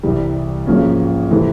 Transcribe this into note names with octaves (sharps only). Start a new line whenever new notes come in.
C2 C3 E3 G3
G#1 G#2 F3 A#3 C#4
C3 E3 A3 C4